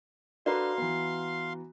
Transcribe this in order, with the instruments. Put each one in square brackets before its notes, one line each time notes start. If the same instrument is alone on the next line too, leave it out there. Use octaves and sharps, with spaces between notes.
[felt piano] D4 A4 B4 [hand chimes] F#4 A#5 [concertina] F5 C6
[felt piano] E3 B3